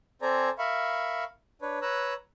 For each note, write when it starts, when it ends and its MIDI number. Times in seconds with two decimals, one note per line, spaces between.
0.22 0.50 60
0.22 0.50 69
0.22 0.50 72
0.22 0.50 74
0.22 0.50 80
0.22 0.50 82
0.59 1.24 70
0.59 1.24 76
0.59 1.24 77
0.59 1.24 83
0.59 1.24 85
1.62 1.79 62
1.62 1.79 71
1.62 1.79 73
1.82 2.14 71
1.82 2.14 73
1.82 2.14 82
1.82 2.14 88
1.82 2.14 90